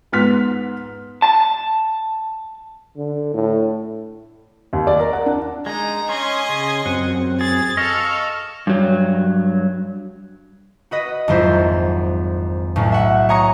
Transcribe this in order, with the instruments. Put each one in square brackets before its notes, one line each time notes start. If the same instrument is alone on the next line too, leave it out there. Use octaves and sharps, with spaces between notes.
[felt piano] G#2 B3 C6 F6 B6
[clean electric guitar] A5
[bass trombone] D3
A2
[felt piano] D#2
D5
A#4
F#5
D4
[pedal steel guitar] G#3 D#4 [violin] A#5
[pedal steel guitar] C#4 [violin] D#5 G#6 [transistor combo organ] G#5 C6
[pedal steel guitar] C#3
[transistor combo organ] F#2 C4 [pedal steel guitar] F#5
[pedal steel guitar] G#4 [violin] A6
[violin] A4 [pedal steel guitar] D#5 F5 [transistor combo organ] C#6 F6
[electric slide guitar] G2 F#3
[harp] F#4 B4 D#5
G#1 F2 F#3 E4 F4 C5
B1 A2 A3
E5 F#5
C#5 G#5 A#5 C#6 D#6 C#7